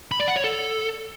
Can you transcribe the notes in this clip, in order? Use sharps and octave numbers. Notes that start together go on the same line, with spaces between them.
B5
D5
F#5
C#5
A4